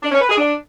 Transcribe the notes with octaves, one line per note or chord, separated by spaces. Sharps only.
D4
C#4
B4
G#4
D4